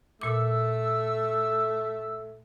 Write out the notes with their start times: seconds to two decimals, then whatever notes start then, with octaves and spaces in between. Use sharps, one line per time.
0.21 A#2 A3 D6 E6